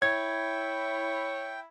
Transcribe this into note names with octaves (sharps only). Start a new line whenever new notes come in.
E4 C#5 G5 G#6